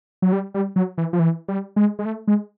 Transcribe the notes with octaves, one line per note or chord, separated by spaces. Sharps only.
F#3
G3
G3
F#3
E3
F3
E3
G3
G#3
G#3
A3
G#3